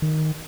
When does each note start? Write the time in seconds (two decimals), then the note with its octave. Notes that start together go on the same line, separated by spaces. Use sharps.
0.02 D#3